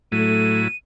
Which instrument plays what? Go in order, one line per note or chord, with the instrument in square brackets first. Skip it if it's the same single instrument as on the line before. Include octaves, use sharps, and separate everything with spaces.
[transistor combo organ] A2 F#3 E4 [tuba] A3 [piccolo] D#7